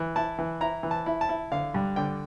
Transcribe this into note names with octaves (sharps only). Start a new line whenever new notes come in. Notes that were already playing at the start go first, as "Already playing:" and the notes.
Already playing: E3
E4 A5
E3
E4 A#5
E3
A5
E4
A5
E4
D3 F5
G2
D3 G5